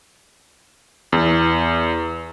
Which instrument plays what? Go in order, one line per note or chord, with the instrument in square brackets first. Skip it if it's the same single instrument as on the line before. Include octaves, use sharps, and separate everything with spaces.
[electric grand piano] E2